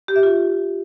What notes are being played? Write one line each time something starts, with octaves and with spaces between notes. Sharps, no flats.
G4
E5
F4